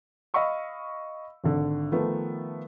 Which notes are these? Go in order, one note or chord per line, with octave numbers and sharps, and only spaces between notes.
D#5 F5 B5 C#6 E6
G#1 D3
D#3 F3 A3 B3